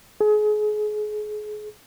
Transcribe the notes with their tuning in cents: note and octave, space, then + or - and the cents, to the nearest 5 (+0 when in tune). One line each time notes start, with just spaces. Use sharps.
G#4 +30